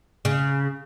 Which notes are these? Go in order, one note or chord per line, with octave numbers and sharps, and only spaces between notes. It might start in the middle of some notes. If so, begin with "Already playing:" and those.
C#3